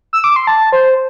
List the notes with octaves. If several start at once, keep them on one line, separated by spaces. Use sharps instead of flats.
E6
D6
C6
A5
C5